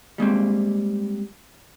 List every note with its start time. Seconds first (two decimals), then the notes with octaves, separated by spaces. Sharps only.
0.18 G3 G#3 A#3 C4